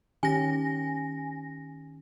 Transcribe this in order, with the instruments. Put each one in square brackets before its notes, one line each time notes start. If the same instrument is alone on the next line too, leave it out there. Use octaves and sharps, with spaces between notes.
[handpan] D#3 C#4 G4 [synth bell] G#5 A#6